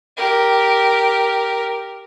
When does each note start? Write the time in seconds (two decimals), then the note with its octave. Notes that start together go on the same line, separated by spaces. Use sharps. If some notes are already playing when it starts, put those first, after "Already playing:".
0.17 G4 A#4